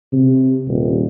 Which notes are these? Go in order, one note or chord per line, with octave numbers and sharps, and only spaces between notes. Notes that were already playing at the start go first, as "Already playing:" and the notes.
C3
D#1